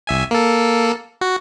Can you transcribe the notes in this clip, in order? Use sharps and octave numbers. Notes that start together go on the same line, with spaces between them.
C2 E5 G#5
A#3 A4
F#4